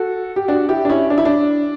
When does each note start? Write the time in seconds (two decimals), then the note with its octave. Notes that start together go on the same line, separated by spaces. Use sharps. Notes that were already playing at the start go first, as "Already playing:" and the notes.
Already playing: F#4 A4
0.36 G4
0.48 D4 F#4
0.69 E4 G4
0.85 D4
0.89 C#4 E4
1.10 D4
1.18 E4
1.25 D4